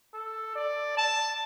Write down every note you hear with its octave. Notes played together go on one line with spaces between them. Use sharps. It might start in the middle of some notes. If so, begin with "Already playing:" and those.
A4
D5
A5